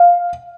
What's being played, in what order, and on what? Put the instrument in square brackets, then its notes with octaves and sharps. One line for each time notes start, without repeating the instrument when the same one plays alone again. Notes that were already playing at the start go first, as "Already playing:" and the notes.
Already playing: [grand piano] F5